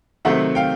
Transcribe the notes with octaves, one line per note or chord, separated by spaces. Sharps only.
C3 D#3 F#3 A3 C4 E5 F#5
F5 G5